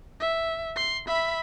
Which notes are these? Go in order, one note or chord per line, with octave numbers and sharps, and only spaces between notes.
E5
C6
E5 B5